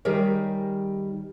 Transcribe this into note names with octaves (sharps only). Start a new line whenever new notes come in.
D#3 G3 G4 G#4 A#4 C#5